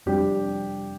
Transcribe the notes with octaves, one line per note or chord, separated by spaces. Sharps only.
F2 C3 G3 D4 G4